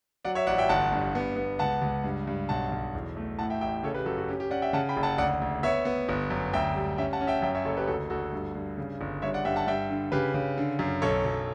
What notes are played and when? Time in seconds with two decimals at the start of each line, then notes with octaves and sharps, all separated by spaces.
0.25 F#3 D5 F#5
0.35 C#5 E5
0.47 A1 D5 F#5
0.58 E5 G5
0.69 G1 F#5 A5
0.92 G2
1.15 B3
1.36 B3
1.59 C#2 F#5 A5
1.82 C#2
2.04 G2
2.27 G2
2.49 B1 F#5 A5
2.72 B1
2.95 E2
3.17 A3
3.39 A2 F#5 A5
3.50 E5 G5
3.61 A1 E5 G5
3.83 C#3 A4 C#5
3.94 G4 B4
4.06 F#2 F#4 A4
4.17 F#4
4.29 C#4 G4
4.40 G4
4.51 C#4 D5 F#5
4.62 E5 G5
4.73 C#3 F#5 A5
4.89 G5 B5
4.96 F#1
5.03 F#5 A5
5.18 D2 D5 F#5
5.42 D2
5.63 B3 C#5 E5
5.85 B3
6.09 G1
6.31 F#2
6.53 D2 E5 G5
6.75 G3
6.98 C#4 E5 G5
7.13 F#5 A5
7.21 C#4
7.27 E5 G5
7.42 F#2 E5 G5
7.55 C#5 E5
7.65 F#1 A4 C#5
7.77 G4 B4
7.88 D2 F#4 A4
8.10 D2 F#4 A4
8.33 G2
8.55 G2
8.78 C#3
9.01 G1
9.22 G2 C#5 E5
9.34 D5 F#5
9.45 G2 E5 G5
9.56 F#5 A5
9.67 G2 E5 G5
9.90 D3
10.12 C#3 G4 B4
10.34 C#3
10.58 D3
10.79 F#2
11.02 B1 A4 C#5
11.24 B1